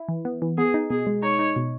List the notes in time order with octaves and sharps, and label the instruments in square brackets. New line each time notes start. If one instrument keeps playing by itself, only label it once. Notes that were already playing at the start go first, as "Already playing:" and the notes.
Already playing: [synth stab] E4
E3
B3
E3
[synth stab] B3 [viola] G#4
[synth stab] D#4
[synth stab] B2 [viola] G#4
[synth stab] G#3
[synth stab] D#4 [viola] C#5
[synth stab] D#4
B2